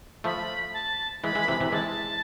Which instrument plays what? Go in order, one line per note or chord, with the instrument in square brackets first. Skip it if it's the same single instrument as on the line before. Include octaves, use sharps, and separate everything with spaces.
[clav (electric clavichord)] F3 A3 [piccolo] B5
[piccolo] A5
[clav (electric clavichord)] E3 G#3 [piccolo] B5
[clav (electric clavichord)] E3 G#3
C3 E3
C3 E3
[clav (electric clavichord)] E3 G#3 [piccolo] A5